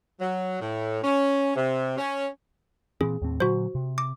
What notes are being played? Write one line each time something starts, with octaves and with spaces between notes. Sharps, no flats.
F#3
A2
C#4
C3
C#4
A#2 E3 C4 G#4
D#2 A2 C4
A#2 D3 F#3 F#4 C5
C3
D6